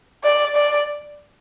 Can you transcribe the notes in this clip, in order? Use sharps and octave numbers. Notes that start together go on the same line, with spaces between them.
D5
D5